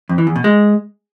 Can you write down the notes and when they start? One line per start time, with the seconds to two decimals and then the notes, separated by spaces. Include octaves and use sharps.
0.09 F2
0.18 E3
0.27 E2
0.36 B2
0.44 G#3